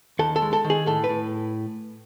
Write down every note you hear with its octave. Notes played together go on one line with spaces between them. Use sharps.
D#2 A4
A4
G#3
A4
D#3
G#4
A2 A4
B4
A2